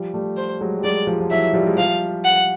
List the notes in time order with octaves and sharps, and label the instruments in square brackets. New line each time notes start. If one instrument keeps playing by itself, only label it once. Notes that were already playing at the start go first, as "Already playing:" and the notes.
Already playing: [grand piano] F3 G3
G3 A3
[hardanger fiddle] C5
[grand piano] F#3 G#3
G3
[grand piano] F#3 G#3 [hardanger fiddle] D5
[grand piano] F3 G3
F3
[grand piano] E3 F#3 [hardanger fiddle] E5
[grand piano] F3 G3
G#3
[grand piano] F3 G3 [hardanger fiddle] F5
[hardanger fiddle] F#5